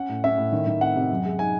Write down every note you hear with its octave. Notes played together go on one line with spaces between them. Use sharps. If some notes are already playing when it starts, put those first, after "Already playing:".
Already playing: C#4 F#5
A2
C#4 E5
A2
D#3
D#3
C4 F#5
C3
F#2
G#3
D#4 G#5